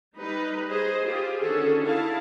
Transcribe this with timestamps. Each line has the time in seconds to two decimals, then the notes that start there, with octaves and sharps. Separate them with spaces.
0.16 G3 D#4 B4
0.69 G#4 C5 D#5
1.06 F4 G4 G#4
1.41 D3 D#3 C#4 F#4 G#4 A4
1.83 E4 G#4 F5 A5